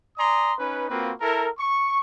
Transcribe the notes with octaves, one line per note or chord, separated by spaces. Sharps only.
D5 G#5 A#5 C6 D#6
C#4 D#4 B4
A#3 C4 F4 F#4 B4
E4 A4 A#4
C#6